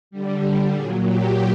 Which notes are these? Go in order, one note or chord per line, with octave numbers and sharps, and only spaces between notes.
D3 G3
A#2 F#3 G#4
G4